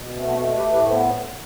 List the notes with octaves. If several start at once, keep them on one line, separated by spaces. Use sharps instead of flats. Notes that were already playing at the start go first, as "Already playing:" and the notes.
Already playing: B2
A3 C4
B3
C4
A3 F#4 A4
G4 B4
A2
G4 B4
B3 A4 C5